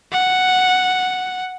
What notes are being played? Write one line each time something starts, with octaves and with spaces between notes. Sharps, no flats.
F#5